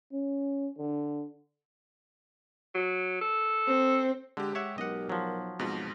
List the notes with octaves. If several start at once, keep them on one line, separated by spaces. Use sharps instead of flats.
C#4
D3
F#3
A4
C4
D3 G#3 G4
C#5 E5 F#5
B1 A#4 D#5 F#5
F3 F#3
F2 G#2 B2 F4